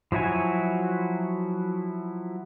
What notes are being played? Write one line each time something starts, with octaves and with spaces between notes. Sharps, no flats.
F3 F#3 E4 F#4 G#5